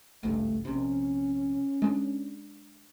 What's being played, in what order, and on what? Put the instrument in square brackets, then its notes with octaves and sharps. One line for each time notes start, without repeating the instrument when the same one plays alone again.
[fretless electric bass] G#1 C#2 G2 [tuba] A3
[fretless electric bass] A#1 C3 [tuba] C#4
[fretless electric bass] G#3 A3 D4